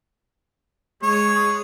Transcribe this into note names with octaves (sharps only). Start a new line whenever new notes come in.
G#3 C#5